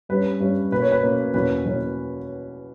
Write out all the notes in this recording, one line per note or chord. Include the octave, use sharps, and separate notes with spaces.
G2 G3 C#4 B4
G2 G3 C#4
B2 A#3 C#4 B4
C#5
B4
B2 A#3 C#4
E2 B2 A#3 C#4 B4
E2 B2 A#3 C#4